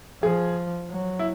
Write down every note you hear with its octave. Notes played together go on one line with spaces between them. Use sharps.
F3 G#4
F#3
E4